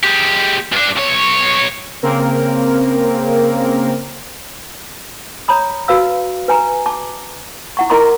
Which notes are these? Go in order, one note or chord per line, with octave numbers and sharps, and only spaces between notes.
G#3 G4
G2 D4
B1 C#5
C#3 A#3 C4 A#4
C#5 A#5 B5 D#6
F#4 B4 F5 E6
B4 G#5 A#5
A5 D6
E4 F#5 C#6
E4 A#4 D#5 A#5 C6 D6